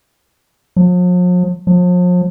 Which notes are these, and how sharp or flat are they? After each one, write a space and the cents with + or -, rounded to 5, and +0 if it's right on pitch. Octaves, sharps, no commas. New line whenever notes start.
F3 +45
F3 +40